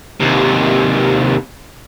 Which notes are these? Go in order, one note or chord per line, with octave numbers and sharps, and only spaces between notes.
D#2 C3